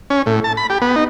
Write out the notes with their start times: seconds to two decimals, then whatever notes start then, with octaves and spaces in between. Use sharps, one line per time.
0.10 C#4
0.26 A2
0.44 A5
0.57 B5
0.70 G4
0.82 B3
0.96 D#4